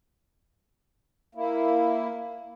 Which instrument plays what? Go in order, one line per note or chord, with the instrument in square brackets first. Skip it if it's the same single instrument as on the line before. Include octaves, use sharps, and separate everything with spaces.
[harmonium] A#3 E4